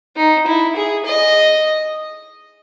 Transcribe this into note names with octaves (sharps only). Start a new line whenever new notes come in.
D#4
E4
G#4
D#5